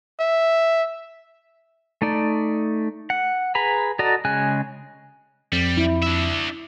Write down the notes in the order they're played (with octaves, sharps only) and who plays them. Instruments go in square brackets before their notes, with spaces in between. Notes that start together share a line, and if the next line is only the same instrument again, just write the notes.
[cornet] E5
[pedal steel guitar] A3 D#4 D5
F#5
G#4 B4 A#5 B5
F#4 A4 D5 D#5 A#5
C#3 G#3 G#5 F#6
[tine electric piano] F2 [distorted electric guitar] G3
[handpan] E4
[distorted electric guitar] D4 E5